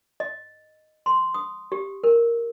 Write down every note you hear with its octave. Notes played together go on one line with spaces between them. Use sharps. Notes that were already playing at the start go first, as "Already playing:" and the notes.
D#5
C6
D#6
G4
A#4